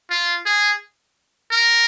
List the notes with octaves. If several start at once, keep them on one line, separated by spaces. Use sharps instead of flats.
F4
G#4
A#4